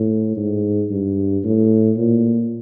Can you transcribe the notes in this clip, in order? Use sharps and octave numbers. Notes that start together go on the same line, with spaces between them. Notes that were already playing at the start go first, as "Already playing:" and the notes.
Already playing: A2
G#2
G2
A2
A#2